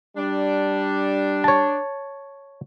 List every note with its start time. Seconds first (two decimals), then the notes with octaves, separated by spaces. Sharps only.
0.17 G3 D4
1.44 C#5 A5